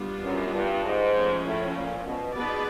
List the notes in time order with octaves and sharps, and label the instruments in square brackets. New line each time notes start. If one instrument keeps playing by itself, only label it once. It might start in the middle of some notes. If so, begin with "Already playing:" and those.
Already playing: [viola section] G3 B3 D4 F4
[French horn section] F#2
G2
G#2
[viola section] F3 A3 C#4
[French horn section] A2
A#2
B2
[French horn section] B2 [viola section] B3 D#4 G#4 B4 D5